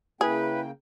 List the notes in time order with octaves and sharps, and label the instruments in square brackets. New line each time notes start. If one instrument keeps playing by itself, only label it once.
[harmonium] C#3 A#3 G5 [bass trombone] E4 [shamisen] G#4 [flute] B4